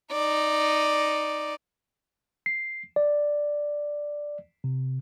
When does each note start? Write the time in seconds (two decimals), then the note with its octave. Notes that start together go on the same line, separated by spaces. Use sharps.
0.12 D#4 D5
2.46 C7
2.96 D5
4.64 C3